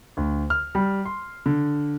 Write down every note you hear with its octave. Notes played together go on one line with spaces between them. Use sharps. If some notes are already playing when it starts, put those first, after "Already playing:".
D2
F6
G3
C6
D3